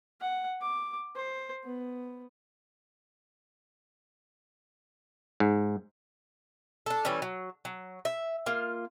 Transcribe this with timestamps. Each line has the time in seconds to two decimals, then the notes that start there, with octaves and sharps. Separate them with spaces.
0.21 F#5
0.61 D6
1.15 C5
1.64 B3
5.40 G#2
6.86 D4 A4
7.05 E3 G3 A3 C#4
7.22 F#3
7.65 F#3
8.05 E5
8.46 A#3 F4